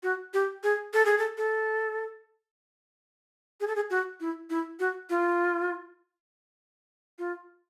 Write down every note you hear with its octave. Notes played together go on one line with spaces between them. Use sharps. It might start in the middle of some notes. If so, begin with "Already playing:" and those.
F#4
G4
G#4
A4
G#4
A4
A4
G#4
A4
G#4
F#4
E4
E4
F#4
F4
F4